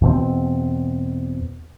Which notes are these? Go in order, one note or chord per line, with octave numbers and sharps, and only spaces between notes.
E2 B2 C4